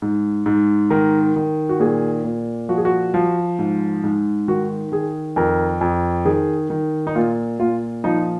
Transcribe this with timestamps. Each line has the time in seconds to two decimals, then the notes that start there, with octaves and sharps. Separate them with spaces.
0.02 G#2
0.46 G#2
0.90 D#3 A#4
1.36 D#3
1.69 F#4
1.80 A#2 G#4
2.24 A#2
2.69 F3 F#4
2.78 G#4
2.85 F#4
3.14 F3
3.59 G#2
4.04 G#2
4.48 D#3 F#4
4.92 D#3 G#4
5.36 F2 A#4
5.81 F2
6.25 D#3 G#4
6.70 D#3
7.07 D#4
7.15 A#2 F4
7.59 A#2 F4
8.04 F3 D#4